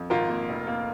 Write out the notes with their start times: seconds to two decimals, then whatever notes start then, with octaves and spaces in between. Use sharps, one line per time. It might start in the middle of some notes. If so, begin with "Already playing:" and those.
Already playing: F2
0.10 G#1 F4 A#4
0.29 A#3
0.49 F1
0.67 A#3